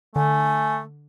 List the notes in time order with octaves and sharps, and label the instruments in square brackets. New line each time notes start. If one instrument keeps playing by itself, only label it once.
[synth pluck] D3 [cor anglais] A3 [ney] G#5